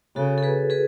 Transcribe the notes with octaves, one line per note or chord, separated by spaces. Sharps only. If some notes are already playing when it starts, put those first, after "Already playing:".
C#3 F#4 A4
A4
G#4 B4
G#4 B4